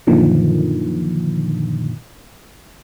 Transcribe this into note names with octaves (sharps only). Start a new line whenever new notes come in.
F#2 A#2 D3 D#3 F3